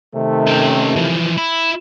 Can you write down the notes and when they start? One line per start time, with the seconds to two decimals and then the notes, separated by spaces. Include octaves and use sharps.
0.15 C3 D#3 A3
0.47 C#4 G5
0.96 E3 F3
1.37 E4